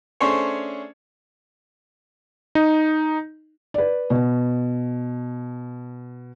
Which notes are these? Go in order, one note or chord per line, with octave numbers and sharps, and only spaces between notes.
A3 C#4 D4 G#4 C5 C#5
D#4
B4 D5
B2